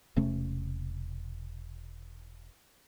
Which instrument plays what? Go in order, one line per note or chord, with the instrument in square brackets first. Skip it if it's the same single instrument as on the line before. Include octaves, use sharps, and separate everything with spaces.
[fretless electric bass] E1 C3 A3 C#4